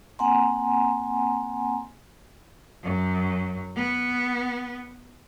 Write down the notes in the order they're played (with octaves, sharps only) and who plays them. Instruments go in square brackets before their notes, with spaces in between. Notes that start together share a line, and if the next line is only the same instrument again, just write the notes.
[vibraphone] A#3 C4 F#5 G#5 A#5 C6
[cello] F#2
B3